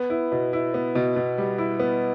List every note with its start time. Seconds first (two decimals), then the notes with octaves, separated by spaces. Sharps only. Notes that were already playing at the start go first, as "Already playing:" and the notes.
Already playing: B3
0.10 E4
0.32 B2
0.53 E4
0.74 B3
0.95 B2
1.16 B2
1.38 G3
1.58 E4
1.79 B3